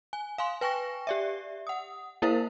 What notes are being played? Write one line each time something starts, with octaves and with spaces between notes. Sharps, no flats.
G#5
F5 G#5 C6
B4 G5 G#5 C#6 A#6
G4 D5 E5
F#5 D#6
A#3 E4 A#4 C5 F5